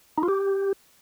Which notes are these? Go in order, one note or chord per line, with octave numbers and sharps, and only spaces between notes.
D#4
F4
G4